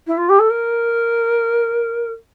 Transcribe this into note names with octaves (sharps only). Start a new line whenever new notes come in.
E4
F4
G4
A4
A#4